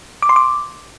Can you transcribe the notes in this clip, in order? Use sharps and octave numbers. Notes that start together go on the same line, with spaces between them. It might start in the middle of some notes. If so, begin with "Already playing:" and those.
D6
C6
D6